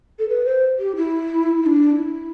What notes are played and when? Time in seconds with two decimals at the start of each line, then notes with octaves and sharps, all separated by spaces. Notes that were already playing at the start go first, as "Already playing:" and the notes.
0.19 A4
0.29 B4
0.45 C5
0.79 G4
0.96 E4
1.62 E4
1.66 D4
1.95 E4